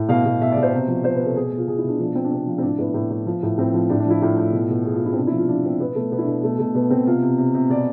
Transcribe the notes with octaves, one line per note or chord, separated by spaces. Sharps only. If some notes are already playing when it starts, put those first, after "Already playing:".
Already playing: A2
B2 F5
B2
B2 E5
D5
B2
C5
C3
F3
F3 C5
C3 B4
A4
B2 G#4
B2
F4
B2 G#4
E4
B2 D4
F3 D4
F3 C4
D4
C3 C4
F3
C4
A2 D4
A2 B3
A2
A2
F3
A2
A2 C4
F3
A2 D4
D4
F3 E4
A2 F4
A2
B2
B2
B2 G#4
F4
B2
E4
C4
C3 D4
E4
F3
F4
F3 D4
C3 C4
B2 B3
B2 A3
B2 B3
E4
D4
B2
B2 A3
B2 A3
B2 B3
B2 C4
C3 F4
C3
C3
C3
B2 D5